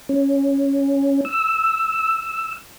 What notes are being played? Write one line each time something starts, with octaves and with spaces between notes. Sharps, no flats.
C#4
E6